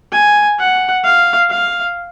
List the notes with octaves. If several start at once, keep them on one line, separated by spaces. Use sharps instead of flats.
G#5
F#5
F5
F5